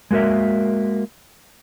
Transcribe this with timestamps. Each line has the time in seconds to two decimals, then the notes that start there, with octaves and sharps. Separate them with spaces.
0.11 G#3 A#3 F#4 A#4 E5